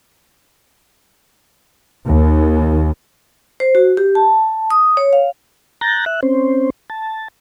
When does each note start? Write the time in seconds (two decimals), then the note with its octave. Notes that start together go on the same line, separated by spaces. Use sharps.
2.07 D#2
3.60 C5
3.75 F#4
3.97 G4
4.15 A5
4.70 D#6
4.97 C#5
5.13 F5
5.81 A#5 F#6 G6 A6 A#6
6.06 E5 F#6
6.23 C4 C#4 C5
6.90 A5